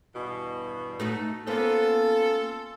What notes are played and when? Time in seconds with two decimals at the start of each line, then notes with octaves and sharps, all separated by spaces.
0.15 E2 G2 B2
1.00 A3 D#4 F#4
1.47 A#3 B3 C#4 F4 A4 C5